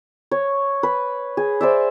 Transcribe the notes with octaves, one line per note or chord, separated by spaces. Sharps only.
C#5
B4
G#4
C5 D5 E5